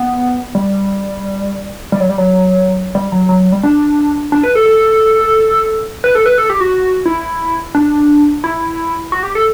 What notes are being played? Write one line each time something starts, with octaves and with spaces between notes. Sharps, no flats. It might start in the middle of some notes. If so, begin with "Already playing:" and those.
Already playing: B3
G3
G3
F#3
G3
F#3
G3
F#3
F#3
F#3
G3
D4
D4
B4
A4
A4
B4
A4
B4
A4
G4
F#4
E4
D4
E4
F#4
G4
A4